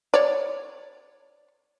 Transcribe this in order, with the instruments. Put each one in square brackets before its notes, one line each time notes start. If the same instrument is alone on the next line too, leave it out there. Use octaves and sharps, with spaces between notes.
[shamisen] C#5 D5